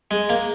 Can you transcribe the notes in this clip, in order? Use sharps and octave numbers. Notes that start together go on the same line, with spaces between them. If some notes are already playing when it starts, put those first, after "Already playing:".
G#3
A#3